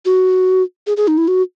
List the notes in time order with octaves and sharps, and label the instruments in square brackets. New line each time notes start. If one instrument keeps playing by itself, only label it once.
[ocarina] F#4
G#4
G#4
D#4
E4
F#4